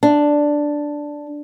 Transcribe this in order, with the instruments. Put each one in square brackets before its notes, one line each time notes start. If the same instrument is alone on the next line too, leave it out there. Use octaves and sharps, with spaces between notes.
[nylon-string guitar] D4